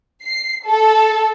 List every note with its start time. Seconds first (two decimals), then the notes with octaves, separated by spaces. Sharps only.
0.23 C7
0.65 A4